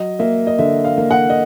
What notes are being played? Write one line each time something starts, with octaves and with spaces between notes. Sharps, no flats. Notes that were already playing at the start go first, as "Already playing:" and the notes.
Already playing: F#3 D#5
A#3 E5
D#5
D3 E5
F5
A#3
F#5
D#5